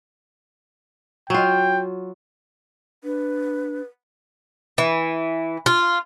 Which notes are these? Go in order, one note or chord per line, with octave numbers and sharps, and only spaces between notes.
F#3 F4 G5
D4 B4
E3
F4